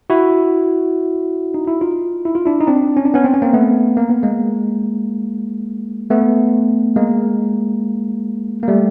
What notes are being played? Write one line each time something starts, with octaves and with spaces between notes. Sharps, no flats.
E4 F#4
D#4
E4
D#4 F4
E4
F4
D4 E4
D#4
C4 D4
C#4
D4
B3 C#4
C4
C#4
A#3 C4
A3 B3
A#3
B3
G#3 A#3
A3 B3
G#3 A#3
A#3
G3 A3